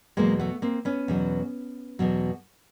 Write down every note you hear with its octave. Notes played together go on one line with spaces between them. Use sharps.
E2 B2 F#3 G#3 A#3
A3 B3
A#3 C4
B3 C#4
E2 B2 F#3
E2 B2 F#3